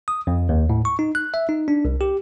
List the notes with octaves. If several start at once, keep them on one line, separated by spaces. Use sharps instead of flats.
D#6
F2
D#2
A2
C#6
D#4
F#6
E5
D#4
D4
C2
G4